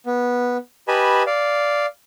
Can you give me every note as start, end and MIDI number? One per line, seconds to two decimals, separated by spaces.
0.06 0.57 59
0.88 1.23 67
0.88 1.23 71
0.88 1.23 75
0.88 1.23 80
0.88 1.23 81
0.88 1.23 83
1.27 1.86 74
1.27 1.86 77